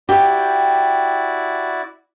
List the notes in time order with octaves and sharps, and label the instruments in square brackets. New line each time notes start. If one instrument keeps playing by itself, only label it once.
[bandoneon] E4 F#4 D5 [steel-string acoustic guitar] G4 G5